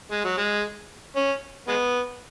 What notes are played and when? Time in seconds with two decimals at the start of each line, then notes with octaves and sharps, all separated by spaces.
0.12 G#3
0.24 F#3
0.38 G#3
1.16 C#4
1.68 G#3 B3